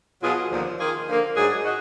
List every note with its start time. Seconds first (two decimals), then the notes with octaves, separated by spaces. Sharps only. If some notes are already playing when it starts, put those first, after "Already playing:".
0.22 B2 F#3 B3 F4 G#4
0.50 D#2 D3 F3
0.79 D#3 A#3 F4 G#4
1.08 D3 F3 A#3
1.35 G#2 F#3 D4 G#4
1.65 D#4 F#4